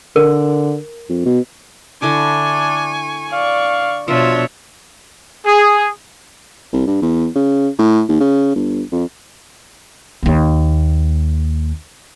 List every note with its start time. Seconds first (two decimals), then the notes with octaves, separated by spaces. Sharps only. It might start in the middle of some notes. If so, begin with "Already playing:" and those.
0.16 D3 A#4
1.09 F2
1.26 B2
2.02 D3 D4 E4 G#5 C#6 D6
3.32 D5 F5 C#6
4.08 B2 F3 D4 F4 C#5 E5
5.46 G#4
6.73 C2
6.87 G2
7.02 E2
7.36 C#3
7.79 A2
8.09 D#2
8.21 C#3
8.55 G1
8.92 F2
10.23 D#2 A#3